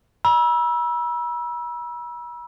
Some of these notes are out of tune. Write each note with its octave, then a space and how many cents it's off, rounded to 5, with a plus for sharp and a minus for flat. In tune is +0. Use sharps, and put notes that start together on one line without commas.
B5 -45 E6 +0